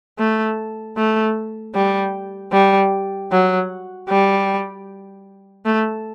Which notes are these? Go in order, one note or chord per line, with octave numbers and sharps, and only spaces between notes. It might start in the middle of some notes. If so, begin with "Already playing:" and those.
A3
A3
G3
G3
F#3
G3
A3